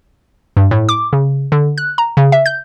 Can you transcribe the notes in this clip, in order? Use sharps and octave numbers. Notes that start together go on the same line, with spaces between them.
G2
A2
D6
C#3
D3
F#6
A#5
C#3
E5
G6